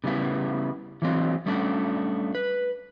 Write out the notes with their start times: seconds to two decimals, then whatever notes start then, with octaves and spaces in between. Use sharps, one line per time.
0.04 C#3 G3 B3 E4
1.02 E3 F#3 G#3 C4
1.46 G3 A3 C#4 D4
2.35 B4